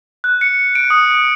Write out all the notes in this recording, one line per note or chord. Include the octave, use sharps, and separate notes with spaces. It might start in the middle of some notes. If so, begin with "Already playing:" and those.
F#6
C#7
D7
D#6